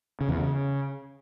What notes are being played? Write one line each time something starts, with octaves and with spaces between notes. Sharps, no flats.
C#3
E2
C#3